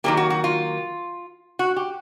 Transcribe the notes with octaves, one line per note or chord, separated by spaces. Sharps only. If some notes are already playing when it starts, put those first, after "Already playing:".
D#3 F#3 A#3 G4
F#4
F#4
F4
F#4
G4